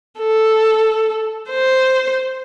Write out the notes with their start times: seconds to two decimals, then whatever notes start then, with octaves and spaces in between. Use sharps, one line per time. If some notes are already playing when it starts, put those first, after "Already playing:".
0.20 A4
1.50 C5